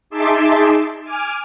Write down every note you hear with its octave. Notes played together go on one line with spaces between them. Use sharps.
D#4 G#4 E5 A5 C6 D6
G#5 D6 F6